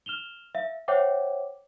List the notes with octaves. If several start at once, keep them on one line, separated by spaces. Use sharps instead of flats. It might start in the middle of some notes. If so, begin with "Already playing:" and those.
F6 E7 F7 G7
E5 F5
C5 C#5 E5 F#5 G5 D6